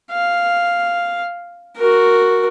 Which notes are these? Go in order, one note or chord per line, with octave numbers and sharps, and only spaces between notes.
F5
F#4 A#4